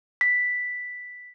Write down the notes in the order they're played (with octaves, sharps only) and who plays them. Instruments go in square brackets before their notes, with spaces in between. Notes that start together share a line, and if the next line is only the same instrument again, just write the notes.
[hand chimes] B6